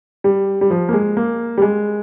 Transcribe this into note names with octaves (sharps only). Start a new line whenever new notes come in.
G3
G3
F3
A#3
G#3
A#3
G3
G#3